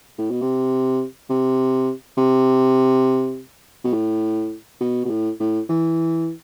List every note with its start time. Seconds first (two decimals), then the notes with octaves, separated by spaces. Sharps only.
0.18 A2
0.31 B2
0.42 C3
1.30 C3
2.18 C3
3.84 B2
3.93 A2
4.81 B2
5.05 B2
5.10 A2
5.40 A2
5.69 E3